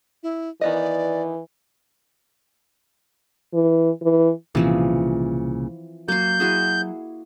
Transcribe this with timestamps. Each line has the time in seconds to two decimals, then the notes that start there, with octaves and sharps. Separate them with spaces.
0.23 E4
0.61 D#3 E3 B3 D5 D#5
3.54 E3
4.03 E3
4.55 C2 A#2 C#3 E3 F3 C4
6.08 F#3 A#3 C6 G6
6.40 E4 F#4 G#4